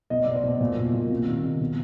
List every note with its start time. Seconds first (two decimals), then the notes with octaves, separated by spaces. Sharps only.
0.10 B2 D#5
0.23 D5
0.27 B2
0.35 C5
0.44 B2
0.61 A#2
0.77 A#2
0.93 A#2
1.11 C3
1.27 D#3
1.44 C3
1.61 B2